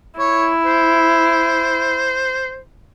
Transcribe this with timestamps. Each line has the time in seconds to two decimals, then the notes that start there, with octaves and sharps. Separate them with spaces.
0.19 E4 C#5
0.65 C5